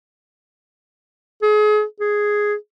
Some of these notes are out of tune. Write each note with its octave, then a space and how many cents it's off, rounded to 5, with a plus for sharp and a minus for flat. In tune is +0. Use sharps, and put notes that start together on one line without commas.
G#4 +35
G#4 +0